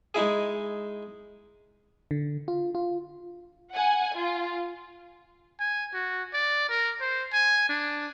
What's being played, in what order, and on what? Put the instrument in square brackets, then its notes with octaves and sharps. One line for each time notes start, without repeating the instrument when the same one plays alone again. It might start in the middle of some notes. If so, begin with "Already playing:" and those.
[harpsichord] G#3 D#4 E4 G#4
[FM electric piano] D3
F4
F4
[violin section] F#5 G#5
F4
[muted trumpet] G#5
F#4
D5
A#4
C5
G#5
D4